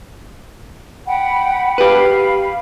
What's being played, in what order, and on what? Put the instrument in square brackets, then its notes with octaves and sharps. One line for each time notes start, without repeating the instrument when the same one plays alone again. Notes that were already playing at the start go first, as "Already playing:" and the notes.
[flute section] F#5 G5 B5
[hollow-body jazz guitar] G4 B4 [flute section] F5 B5